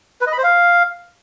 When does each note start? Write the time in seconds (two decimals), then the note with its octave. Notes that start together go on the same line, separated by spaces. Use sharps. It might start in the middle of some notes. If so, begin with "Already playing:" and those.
0.21 B4
0.27 D#5
0.32 B5
0.38 C5
0.44 F5